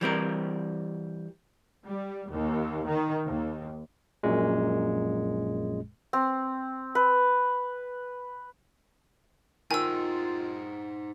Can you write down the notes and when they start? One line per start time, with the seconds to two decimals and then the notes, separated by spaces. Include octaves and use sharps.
0.01 E3 G3 C4 A#4
1.86 G3
2.31 D#2
2.88 D#3
3.26 D#2
4.23 A#1 F#2 A#2 G#3
6.13 C4
6.95 B4
9.71 D#3 D#4 F4 C5 G#5 E6